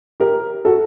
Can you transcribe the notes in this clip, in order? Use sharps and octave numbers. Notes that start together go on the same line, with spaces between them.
G4 A#4
F#4 A4